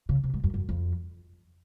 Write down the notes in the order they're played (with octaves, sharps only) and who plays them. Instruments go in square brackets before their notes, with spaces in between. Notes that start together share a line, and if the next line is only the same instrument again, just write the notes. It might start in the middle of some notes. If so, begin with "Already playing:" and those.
[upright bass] C#3
C3
G#2
F#2
F#2
F2